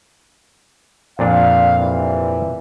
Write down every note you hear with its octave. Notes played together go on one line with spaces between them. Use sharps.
F2 A#2 D4 F5
C3 E3 G3